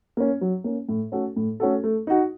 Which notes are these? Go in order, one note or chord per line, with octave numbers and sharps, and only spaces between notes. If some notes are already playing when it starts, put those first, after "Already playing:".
A#3 C#4
F#3
A#3 C#4
A2
A3 C#4 F#4 A4
A2
A3 C#4 F#4 A4
A3
D#4 F#4